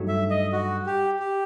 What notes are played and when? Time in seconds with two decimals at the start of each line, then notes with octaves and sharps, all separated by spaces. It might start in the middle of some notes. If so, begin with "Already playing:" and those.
Already playing: G2 F#3 A3 D#4
0.08 E5
0.30 D#5
0.53 F#4
0.86 G4
1.19 G4